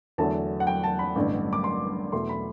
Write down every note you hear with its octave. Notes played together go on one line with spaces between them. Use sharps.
E2 D3 F#3 A3 A5
F#5
G5
A5
B5
A1 G2 D3 G3
D6
C6
E2 B2 A3 C6
B5